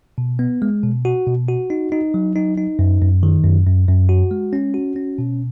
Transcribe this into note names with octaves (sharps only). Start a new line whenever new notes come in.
B2
B3
G#3
B2
F#4
B2
F#4
D#4
D#4
F#3
D#4
D#4
F#2
F#2
D#3
F#2
F#2
F#2
F#4
G#3
C#4
F#4
C#4
B2